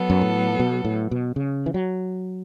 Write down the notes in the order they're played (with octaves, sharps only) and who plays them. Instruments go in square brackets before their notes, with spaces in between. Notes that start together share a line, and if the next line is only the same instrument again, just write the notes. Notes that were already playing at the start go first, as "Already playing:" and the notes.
Already playing: [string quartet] F#3 B3 A4
[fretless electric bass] F#2
A2
B2
A2
B2
C#3
E3
F#3